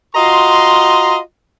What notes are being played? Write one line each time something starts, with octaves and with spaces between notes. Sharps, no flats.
F4 F#4 D#5 A#5 C6